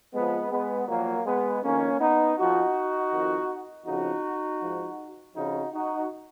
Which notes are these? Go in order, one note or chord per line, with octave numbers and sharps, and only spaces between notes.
F2 F3 G#3 B3
G#3 B3
A#2 F3 F#3 A#3
G#3 B3
F2 D#3 A#3 C#4
B3 D#4
F2 F3 D#4 F#4
F2 D#3
F2 C#3 F3 D#4 F#4
G#2 F3
F2 C#3 F3 D#4 F#4
D#4 F#4